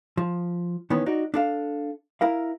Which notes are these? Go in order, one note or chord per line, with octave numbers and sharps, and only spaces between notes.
F3
D#3 E3 B3 C#4
D#4 F#4 D5
D4 A4 F5
E4 A#4 F5